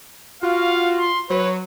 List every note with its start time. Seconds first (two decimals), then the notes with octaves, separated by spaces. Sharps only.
0.43 F4 F#4 F5
0.99 C6
1.30 F#3 B4 C#5